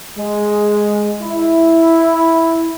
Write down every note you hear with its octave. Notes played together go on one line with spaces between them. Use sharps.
G#3
E4